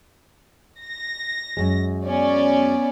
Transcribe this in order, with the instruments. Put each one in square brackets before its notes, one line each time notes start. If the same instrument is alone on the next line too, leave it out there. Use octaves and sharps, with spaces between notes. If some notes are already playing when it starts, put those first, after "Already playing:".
[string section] A#6
[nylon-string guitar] F#2 G#3
[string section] B3 C#4 D5